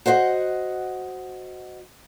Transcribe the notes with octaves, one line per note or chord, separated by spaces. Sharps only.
F#4 C5 D#5 E5 F#5